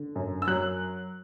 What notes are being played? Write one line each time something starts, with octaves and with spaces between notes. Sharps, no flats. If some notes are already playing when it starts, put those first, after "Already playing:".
Already playing: D3
F#2
E6
F#3 F#6